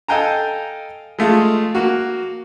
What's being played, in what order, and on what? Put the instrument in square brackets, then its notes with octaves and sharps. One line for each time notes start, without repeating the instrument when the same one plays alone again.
[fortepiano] A4 D#5 F5 G5 G#5 A#5
G#3 A3 F4 G#4
A#3 F#4